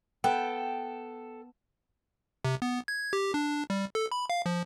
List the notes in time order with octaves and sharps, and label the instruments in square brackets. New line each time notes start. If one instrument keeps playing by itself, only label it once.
[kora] B3 [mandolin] A4 [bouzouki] G5
[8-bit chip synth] C3
B3
G#6
G4
D4
G3
A4
B5
F5
F3